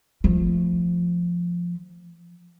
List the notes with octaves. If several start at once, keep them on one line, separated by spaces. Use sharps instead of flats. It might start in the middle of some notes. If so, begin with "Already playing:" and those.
F3 A3